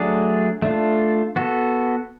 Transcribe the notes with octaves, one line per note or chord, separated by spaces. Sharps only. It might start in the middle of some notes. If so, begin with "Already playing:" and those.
Already playing: F#3 A3 D4 G#4 D5
A3 D4 F4
B3 F#4 A4